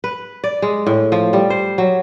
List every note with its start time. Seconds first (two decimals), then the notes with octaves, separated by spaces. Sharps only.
0.04 B4
0.44 D5
0.62 G#3
0.87 A2
1.12 F3
1.33 G3
1.50 C5
1.78 F#3